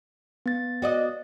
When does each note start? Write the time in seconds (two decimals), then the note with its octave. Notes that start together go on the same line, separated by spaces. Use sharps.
0.46 B3 A6
0.82 F#4 D5 D#5